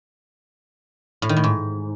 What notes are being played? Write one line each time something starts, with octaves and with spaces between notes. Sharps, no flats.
A2
D#3
A2
G#2